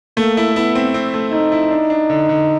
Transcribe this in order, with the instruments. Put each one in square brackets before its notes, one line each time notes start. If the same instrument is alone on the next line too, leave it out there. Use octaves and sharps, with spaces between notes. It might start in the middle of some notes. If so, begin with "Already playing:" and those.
[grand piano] A3 [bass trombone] A#3
[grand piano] E4
[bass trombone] B3 [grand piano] E4
[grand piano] C4
C4
A3
[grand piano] A3 [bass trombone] D#4
[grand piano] E4
D4
D4
D3
D3